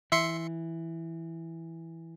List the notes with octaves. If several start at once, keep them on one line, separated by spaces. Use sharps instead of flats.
E3 E5 C6 C#7